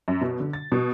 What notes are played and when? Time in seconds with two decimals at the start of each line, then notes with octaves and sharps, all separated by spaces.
0.08 F#2
0.21 B2
0.40 D3
0.53 A6
0.72 B2